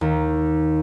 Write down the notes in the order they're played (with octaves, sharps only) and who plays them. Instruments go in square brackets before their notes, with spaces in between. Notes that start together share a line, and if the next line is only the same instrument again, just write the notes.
[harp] D#2